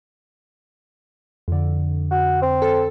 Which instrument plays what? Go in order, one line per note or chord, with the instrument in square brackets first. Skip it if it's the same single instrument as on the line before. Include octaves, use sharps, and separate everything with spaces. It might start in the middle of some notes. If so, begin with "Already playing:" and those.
[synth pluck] F2 D3
[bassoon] F#4
C4
[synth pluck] A4